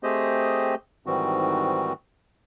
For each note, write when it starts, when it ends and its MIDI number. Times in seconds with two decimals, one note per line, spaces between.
0.03 0.75 57
0.03 0.75 60
0.03 0.75 67
0.03 0.75 68
0.03 0.75 72
0.03 0.75 75
1.06 1.93 44
1.06 1.93 51
1.06 1.93 52
1.06 1.93 55
1.06 1.93 60
1.06 1.93 66